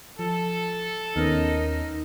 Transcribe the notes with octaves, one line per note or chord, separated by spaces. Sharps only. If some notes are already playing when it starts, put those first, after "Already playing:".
F3 A4
D#2 B3 C#4 D#4 A#4 D#5